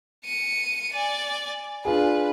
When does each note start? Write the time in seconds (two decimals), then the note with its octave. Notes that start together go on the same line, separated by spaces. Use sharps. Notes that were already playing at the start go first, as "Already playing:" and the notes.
0.25 C#7 D#7
0.93 D5 G#5
1.85 D4 F4 G#4 B4